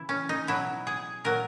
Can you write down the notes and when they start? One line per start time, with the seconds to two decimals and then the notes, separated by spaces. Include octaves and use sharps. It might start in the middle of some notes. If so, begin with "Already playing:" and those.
Already playing: C#3 E3 E4
0.09 C#4
0.29 D#4
0.47 B2 F#3 E4
0.87 G#4
1.24 A#2 F#3 A#4